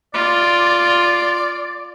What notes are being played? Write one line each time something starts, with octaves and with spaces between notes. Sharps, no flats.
F4 D5